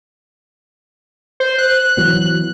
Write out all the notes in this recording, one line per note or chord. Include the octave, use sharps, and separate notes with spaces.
C5
F#6
E3 F#3 B3